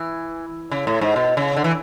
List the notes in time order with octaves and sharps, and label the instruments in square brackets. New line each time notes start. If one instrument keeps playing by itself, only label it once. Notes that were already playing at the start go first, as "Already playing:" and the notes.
Already playing: [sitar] E3
C#3
A2
G#2
B2
C#3
D3
E3